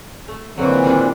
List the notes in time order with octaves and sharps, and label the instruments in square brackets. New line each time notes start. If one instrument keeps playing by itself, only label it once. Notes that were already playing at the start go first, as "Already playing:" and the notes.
[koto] A3
[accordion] A#2 E3 C4 [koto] D3 F#3
[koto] D#3 G3 D4